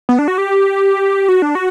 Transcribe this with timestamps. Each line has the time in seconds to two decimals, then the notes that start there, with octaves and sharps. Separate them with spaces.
0.09 B3
0.19 D4
0.28 F#4
0.38 G4
1.29 F#4
1.42 D4
1.55 F#4